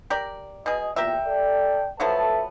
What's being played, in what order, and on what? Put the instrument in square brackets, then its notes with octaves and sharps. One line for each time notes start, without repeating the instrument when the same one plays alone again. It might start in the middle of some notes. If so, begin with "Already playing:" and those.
[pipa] G4 A#4 D5
[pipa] B2 G#4 [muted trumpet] D#5
[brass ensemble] E2 A#2 [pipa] G4 A#4 E5 [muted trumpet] G5
[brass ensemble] A4 D5
[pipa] F3 F#3 B3 [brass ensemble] A4 B4 A5 [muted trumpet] E5